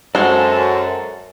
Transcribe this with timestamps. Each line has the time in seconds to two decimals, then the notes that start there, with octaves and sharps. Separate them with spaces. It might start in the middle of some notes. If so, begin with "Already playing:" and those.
0.15 F#2 G#3 C4 F#4 A4 F5 F#5